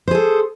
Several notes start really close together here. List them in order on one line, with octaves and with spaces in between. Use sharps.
C5 G#4 A4